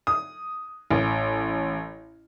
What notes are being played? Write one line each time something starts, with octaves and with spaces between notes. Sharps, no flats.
D#6
A1